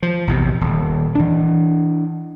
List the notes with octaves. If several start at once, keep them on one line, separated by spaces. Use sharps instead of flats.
F3
A#1 E2 C3
D#1
E3 D4